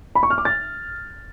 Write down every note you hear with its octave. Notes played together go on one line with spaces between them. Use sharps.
B5
C#6
F6
D6
A6